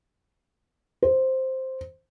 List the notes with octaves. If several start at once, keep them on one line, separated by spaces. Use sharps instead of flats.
C5